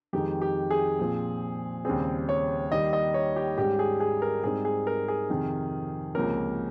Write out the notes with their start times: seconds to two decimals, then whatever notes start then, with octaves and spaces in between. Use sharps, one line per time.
0.13 F2 D#3 G#3 D#4 G4
0.42 G4
0.71 G#4
0.99 A#2 F3 C4
1.85 D#2 C#3 G3 C4 G#4
2.29 C#5
2.71 D#2 D#3 G3 D#5
2.93 D#5
3.14 C#5
3.36 G4
3.57 G#2 G3 C#4 G4
3.79 G#4
4.00 G#4
4.22 A#4
4.43 G#2 G3 C4 D#4 G#4
4.65 G#4
4.87 A#4
5.08 G#4
5.29 F2 C3 D#3
6.15 C#2 C3 F3 A#3 C#4 A#4